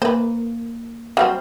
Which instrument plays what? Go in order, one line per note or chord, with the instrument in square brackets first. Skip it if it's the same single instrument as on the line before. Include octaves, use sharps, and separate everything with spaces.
[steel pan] A#3 [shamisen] B4 C5
[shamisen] F#3 G3 C4 [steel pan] F5